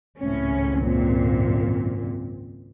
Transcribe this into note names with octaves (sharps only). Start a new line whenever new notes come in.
G#1 C#2 A2 C4 C#4
F#2 A#2